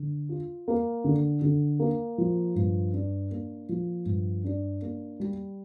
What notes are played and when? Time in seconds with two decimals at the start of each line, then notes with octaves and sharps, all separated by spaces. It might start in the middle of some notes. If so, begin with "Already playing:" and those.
Already playing: D3
0.29 F4
0.68 A#3
1.04 D3
1.42 D3
1.79 A#3
2.18 F3
2.55 G2
2.94 D4
3.31 A#3
3.69 F3
4.06 G2
4.44 D4
4.82 A#3
5.20 G3